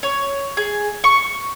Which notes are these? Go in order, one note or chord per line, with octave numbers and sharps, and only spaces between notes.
C#5
G#4
C#6